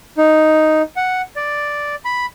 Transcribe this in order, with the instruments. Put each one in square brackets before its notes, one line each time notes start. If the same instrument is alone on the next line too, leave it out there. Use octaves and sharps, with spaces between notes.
[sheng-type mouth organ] D#4
F#5
D5
B5